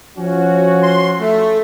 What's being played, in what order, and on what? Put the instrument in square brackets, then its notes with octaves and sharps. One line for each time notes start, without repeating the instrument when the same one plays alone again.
[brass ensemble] F3 C#4 F#4
[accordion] C6
A3